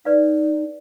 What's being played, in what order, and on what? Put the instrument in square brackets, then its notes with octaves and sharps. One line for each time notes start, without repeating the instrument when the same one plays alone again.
[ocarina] D#4 [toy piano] B4 D5 F5